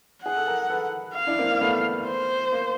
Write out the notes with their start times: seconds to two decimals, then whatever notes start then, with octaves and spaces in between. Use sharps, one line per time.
0.24 G#4 F#5
0.37 A4
0.47 G#4 A#4
0.70 A4 B4
1.15 F5
1.27 D4 E4
1.38 A#3 C4
1.50 A#3
1.61 A3 B3
2.06 C5
2.52 A#3